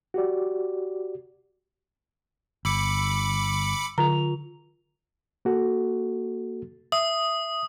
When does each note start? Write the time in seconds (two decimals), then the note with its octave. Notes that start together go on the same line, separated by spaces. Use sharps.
0.14 F#4 G4 D5
2.65 G1 B5 D6 E6 C#7
3.98 D3 F4 A#5 F7
5.45 A#3 F#4 A4
6.92 E5 D#6